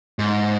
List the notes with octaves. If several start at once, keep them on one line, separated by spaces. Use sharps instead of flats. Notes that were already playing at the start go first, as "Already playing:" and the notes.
G#2